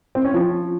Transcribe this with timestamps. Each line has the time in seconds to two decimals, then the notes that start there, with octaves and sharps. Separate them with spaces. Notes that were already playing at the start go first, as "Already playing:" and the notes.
0.15 C4
0.25 C#4
0.34 F3